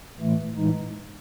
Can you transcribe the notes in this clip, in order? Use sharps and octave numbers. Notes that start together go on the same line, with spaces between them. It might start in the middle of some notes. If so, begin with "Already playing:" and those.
A2 E3 A3
A2 E3 G#3 D#4